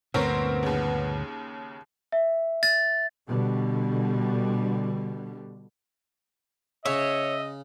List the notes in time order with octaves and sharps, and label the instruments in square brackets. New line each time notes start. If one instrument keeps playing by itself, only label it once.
[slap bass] D2 G2 A#2 [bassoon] B3 [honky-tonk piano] C4 A#4 C#5
[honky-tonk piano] D#2 C#3
[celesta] E5
[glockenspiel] A6
[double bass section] B2 D3 G3
[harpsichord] C#3 [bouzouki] C#5 [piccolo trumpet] D#5 [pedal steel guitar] E5